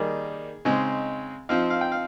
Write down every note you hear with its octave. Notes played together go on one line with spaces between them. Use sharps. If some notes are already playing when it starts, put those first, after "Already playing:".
Already playing: D#3 G3 A#3 D#4 G#4
C#3 G#3 C4 D#4
F3 C4 D#4 F5
F5
G5
F5